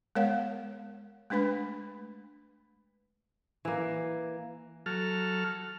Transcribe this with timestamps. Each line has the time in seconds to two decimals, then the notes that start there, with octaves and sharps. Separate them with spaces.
0.15 G#3 B3 A#4 C#5 F5 F#5
1.30 G#3 A3 D4 B4 B5
3.65 E3 A#3
4.86 F#3 A4 F6